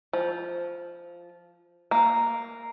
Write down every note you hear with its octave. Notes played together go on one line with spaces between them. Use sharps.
F3
A#3